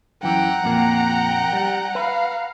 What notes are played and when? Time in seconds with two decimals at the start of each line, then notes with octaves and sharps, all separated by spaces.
0.23 F#2 E3 F#5 G5 A#5
0.64 F2 A#2 A#3 G5
1.53 G3
1.95 B4 F5